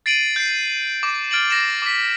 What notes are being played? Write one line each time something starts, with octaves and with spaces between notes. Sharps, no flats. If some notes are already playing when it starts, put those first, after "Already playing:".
A6 C7 D7 D#7 F#7
G6 C7
D6
F6 A6 D7 F#7
A6 A#6 C7 E7
D6 B6